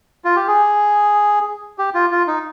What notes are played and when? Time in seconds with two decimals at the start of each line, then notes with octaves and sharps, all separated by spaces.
0.25 F4
0.36 G4
0.47 G#4
1.78 G4
1.94 F4
2.11 F4
2.27 D#4